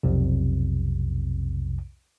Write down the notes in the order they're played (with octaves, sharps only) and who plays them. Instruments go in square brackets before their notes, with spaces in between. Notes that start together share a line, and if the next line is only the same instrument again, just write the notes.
[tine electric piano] B1 F2 C3